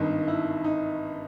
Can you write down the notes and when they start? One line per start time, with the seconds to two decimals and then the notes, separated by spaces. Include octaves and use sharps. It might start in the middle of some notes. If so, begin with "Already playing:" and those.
Already playing: G#1 G2 D#3 D#4
0.28 E4
0.64 D#4